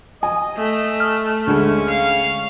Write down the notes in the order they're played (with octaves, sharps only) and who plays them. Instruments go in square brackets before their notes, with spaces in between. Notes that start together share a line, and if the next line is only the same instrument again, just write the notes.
[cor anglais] D#5 [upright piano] G#5
[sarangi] A3
[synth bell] F6
[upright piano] D2 G#3 [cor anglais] C#4
[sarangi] F5